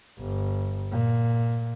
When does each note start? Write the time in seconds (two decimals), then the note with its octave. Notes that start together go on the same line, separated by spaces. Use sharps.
0.19 G1
0.91 A#2